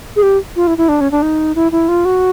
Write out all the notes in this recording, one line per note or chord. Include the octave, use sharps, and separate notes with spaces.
G#4
G4
F4
E4
E4
D4
C#4
D4
D#4
E4
E4
F4
F#4